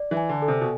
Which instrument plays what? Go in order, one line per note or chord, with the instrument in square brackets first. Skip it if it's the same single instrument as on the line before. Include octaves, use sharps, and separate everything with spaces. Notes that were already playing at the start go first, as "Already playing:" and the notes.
Already playing: [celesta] D5
[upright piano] E3
[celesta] G#5
[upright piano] D3
[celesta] A4
[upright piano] C3
B2